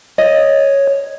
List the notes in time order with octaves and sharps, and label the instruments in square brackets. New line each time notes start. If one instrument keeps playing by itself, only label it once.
[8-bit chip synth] C#5 [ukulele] D#5